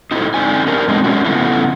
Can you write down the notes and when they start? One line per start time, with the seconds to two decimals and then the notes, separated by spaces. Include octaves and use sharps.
0.11 D#4 E4 F#4 G4 A4 C5
0.34 D3 C4 D#4 D5 G#5
0.67 D4 D#4 G4 A#4 C5
0.88 B2 G#3 A3 C4 D4 D#4
1.04 G#3 C#4 F#4
1.24 C#3 F3 A3 B3 E4 F#4